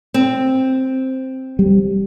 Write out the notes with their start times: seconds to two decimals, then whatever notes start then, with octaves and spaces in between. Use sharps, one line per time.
0.14 C4
1.59 G3